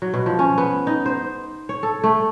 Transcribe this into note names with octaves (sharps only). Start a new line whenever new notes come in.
F#3
B2
F3
C#4
B3
D#4
C5
C#5
A4
A3